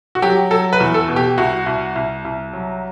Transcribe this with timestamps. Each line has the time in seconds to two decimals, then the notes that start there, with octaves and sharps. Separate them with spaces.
0.15 F#4
0.22 F#3 G4
0.51 F#3 A4
0.73 B4
0.80 E2
0.94 A4
1.08 B2
1.16 G4
1.38 C2 F#4
1.66 C2
1.96 C2
2.25 C2
2.53 F#3